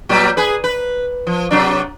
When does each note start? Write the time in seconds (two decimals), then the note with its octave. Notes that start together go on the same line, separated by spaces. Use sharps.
0.09 A#2 F#3 G3
0.37 G#4 B4
0.64 B4
1.27 F3
1.51 C3 F#3 D4